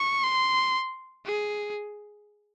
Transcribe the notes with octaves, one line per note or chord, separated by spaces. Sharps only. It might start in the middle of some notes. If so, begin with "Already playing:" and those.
Already playing: C#6
C6
G#4